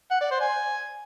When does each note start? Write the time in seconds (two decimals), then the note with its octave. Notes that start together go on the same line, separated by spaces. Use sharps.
0.11 F#5
0.21 D5
0.31 C5
0.41 G#5